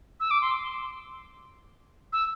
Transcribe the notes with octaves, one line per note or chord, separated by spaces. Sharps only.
E6
D6
C6
E6